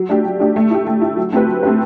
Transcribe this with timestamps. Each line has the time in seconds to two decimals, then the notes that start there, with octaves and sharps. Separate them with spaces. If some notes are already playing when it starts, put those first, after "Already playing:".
Already playing: F#3
0.09 A3 D4 G4
0.24 F#3
0.40 A3 D4 G4
0.56 A3
0.71 E4 G4
0.87 A3
1.02 E4 G4
1.17 F#3
1.33 A3 C4 G4 B4
1.48 F#3
1.63 A3 C4 G4 B4